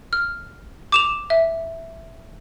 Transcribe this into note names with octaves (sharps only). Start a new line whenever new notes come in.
F6
D6 E7 F7
E5